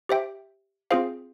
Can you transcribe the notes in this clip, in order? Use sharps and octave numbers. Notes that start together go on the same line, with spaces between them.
G4 C5 E5 G5
C4 F4 G#4 C5 F5